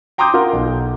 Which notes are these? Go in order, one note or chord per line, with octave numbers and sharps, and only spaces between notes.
G5 A#5 C6 D6 D#6 G6
F4 A#4 F#5
B1